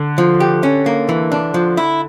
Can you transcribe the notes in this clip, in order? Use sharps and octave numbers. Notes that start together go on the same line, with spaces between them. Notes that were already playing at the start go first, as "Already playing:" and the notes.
Already playing: D3
F3
G4
C#4
A#3
E3
D4
F3
E4